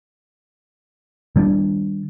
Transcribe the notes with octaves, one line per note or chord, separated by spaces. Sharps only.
D#3 G3 A#3 D4